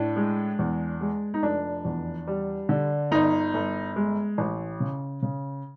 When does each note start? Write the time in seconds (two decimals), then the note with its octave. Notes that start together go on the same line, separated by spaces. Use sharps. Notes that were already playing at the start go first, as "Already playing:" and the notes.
Already playing: A2 D4
0.16 G#3
0.59 E2
1.01 G#3
1.34 D#4
1.43 F1 D4
1.85 E2
2.27 G3
2.69 D3
3.11 G1 D#4
3.54 G1
3.96 G#3
4.38 A1
4.80 C#3
5.22 C#3